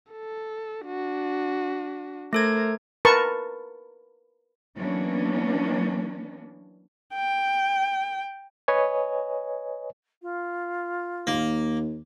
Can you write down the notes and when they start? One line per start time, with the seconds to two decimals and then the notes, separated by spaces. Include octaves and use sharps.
0.11 A4
0.86 D4 F#4
2.33 A3 A4 A#4 C5 G#6
3.05 A#4 B4 A5 C#6
4.74 E3 F#3 A#3 B3 C#4 D4
7.15 G5
8.68 B4 C#5 D#5 G#5
10.22 F4
11.27 D#2 A#3